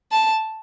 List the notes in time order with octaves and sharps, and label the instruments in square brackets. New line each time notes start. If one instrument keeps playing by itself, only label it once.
[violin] A5